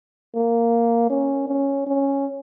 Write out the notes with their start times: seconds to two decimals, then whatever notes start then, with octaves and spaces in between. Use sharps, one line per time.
0.35 A#3
1.10 C#4
1.48 C#4
1.87 C#4